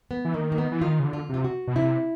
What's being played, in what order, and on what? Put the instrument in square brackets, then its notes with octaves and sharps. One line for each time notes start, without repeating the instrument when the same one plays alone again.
[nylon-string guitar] B3
[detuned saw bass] E3
[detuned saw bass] D#3 [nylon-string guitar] A#3
[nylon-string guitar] A#3
B3
[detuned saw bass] E3
[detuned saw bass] D#3 [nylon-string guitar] F4
[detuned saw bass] C#3
D3
[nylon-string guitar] F4
[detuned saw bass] C3 [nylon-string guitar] F4
[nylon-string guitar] F#4
[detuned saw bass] B2
[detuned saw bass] C3 [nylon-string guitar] E4